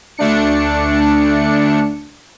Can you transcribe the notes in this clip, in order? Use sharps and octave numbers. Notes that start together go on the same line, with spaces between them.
D2 A3 D4 C#7